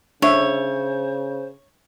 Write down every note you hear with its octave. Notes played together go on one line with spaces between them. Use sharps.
C#3 D4 C5 C#5 E5